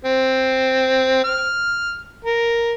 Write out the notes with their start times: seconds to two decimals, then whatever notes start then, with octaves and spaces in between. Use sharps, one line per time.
0.05 C4
1.24 F6
2.25 A#4